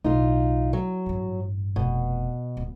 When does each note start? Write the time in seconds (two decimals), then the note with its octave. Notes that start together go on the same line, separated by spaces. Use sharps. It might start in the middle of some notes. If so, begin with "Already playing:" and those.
0.04 B1 A2 D#4 F4
0.73 F#3
1.06 A1 G2
1.76 F1 B2
2.57 D1